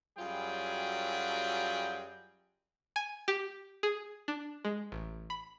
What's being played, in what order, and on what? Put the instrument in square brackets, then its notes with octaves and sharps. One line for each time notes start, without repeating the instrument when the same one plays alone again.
[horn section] F#2 F#3 G3 F4 G#4 G5
[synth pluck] G#5
G4
G#4
D4
G#3
A1
B5